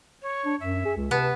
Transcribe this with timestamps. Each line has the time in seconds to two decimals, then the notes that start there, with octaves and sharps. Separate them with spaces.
0.22 C#5
0.45 D4
0.60 F#2 E5
0.85 G#4
0.97 C#2
1.11 C3 B3 A5